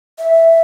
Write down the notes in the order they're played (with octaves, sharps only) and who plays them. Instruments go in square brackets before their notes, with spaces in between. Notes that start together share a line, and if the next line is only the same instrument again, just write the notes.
[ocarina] E5